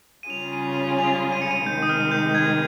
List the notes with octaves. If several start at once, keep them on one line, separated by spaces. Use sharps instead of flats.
D#7
C#3 G3 C#4 F4 G#4 F7
D#7
D#7
D#7
F7
D#7
C#7
D#7
C3 D#3 G#3 G6
D#6
F6
G6
G#6